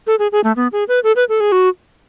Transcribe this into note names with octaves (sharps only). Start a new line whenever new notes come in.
A4
G#4
G#4
A3
B3
G#4
B4
A4
B4
A4
G#4
F#4